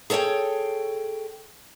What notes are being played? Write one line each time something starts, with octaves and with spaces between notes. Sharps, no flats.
G#4 A4 C#5 E5 G5